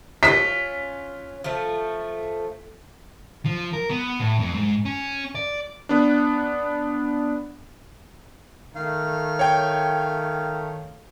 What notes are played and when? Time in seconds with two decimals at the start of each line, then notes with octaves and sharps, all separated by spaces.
0.23 C#4 D#4 F4 B6
1.44 F3 A3
3.45 F3
3.73 A#4
3.90 B3
4.20 A2
4.39 F2
4.54 G#2
4.85 C#4
5.35 D5
5.89 B3 D4
8.75 D#3 A3 F5
9.39 C#5 G5